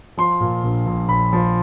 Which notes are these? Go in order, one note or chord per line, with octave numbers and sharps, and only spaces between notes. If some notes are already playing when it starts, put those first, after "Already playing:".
F3 C6
A#2
A#1
A#1
A#1 B5
F3